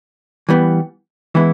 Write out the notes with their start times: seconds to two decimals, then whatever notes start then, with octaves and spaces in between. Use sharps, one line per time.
0.49 E3 G3 B3
1.35 E3 G#3 B3 E4